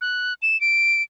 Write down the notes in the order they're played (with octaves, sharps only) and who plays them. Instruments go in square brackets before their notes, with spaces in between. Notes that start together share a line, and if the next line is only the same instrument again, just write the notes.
[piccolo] F#6
E7
D7